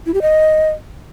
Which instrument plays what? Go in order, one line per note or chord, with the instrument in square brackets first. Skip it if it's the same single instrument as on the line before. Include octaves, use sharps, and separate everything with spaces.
[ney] E4
G4
D#5